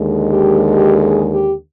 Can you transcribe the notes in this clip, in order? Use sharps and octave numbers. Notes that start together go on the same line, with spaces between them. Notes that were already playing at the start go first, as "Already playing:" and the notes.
Already playing: D#2 D3 G#3
G4
G4
G#4
G4